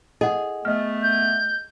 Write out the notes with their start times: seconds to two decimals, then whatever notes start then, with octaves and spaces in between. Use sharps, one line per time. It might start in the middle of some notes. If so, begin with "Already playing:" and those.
0.21 G#4 D#5 F#5
0.65 A3 B3 D#5 F6
1.03 G6